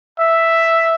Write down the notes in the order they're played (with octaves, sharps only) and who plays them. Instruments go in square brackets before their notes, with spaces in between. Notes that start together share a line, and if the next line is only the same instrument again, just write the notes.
[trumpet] E5